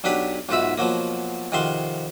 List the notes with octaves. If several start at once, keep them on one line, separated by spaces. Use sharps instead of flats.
B1 F#3 D4 G4 B4
B1 G#2 F4 F#4 E5 B5
B2 F3 F#3 A#3
F2 C3 D#3 F#4 F5 C6